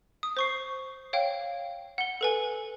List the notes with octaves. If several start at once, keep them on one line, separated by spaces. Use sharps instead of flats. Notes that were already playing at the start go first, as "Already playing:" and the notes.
D#6
C5 C#6 C7
C#5 F5 G5
F#5 G7
A4 B4 G#5